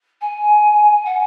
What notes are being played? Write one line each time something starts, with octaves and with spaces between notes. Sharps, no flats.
G#5
F#5